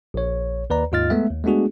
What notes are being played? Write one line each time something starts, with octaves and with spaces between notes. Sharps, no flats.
A#1 C#5
D#2 B4 D5 A#5
D#2 G#2 F4 D#5 F6 A6
G#3 A3 B3 E5
D#2
G#3 A3 B3 D4 F#4 G#4